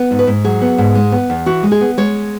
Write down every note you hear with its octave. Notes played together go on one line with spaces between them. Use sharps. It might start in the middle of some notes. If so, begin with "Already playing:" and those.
Already playing: B3
G#2
B4
G#2
F#3 G#4
B3
G#2
G#3
B3
E2
E3 F#4
G#3
G#4
B3
G#3 C#5